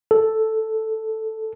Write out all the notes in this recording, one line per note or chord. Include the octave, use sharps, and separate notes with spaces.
A4